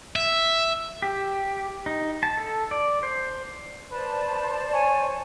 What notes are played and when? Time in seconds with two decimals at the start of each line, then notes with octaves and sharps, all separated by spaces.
0.16 E5
1.02 G4
1.86 D#4
2.23 A5
2.37 A4
2.71 D5
3.03 C5
3.92 B4 C5 D5 A5
4.73 C#5 G#5